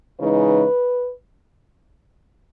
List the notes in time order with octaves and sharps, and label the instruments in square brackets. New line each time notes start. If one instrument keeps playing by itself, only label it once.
[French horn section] C#3 E3 G#3 D#4 B4